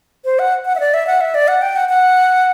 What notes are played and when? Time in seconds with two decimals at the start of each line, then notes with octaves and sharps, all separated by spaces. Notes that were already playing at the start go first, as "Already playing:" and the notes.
0.25 C5
0.39 F#5
0.66 F#5
0.75 E5
0.80 D5
0.94 E5
1.07 F#5
1.21 E5
1.35 D5
1.48 F#5
1.62 G5
1.76 F#5
1.89 F#5